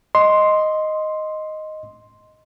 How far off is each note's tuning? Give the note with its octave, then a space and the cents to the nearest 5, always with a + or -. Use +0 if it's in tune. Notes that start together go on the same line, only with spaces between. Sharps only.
D#5 +0 C6 +0